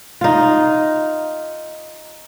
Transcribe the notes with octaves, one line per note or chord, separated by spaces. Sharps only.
D#4 F4